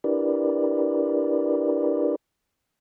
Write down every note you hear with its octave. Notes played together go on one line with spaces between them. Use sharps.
D4 E4 G4 A#4 B4 D5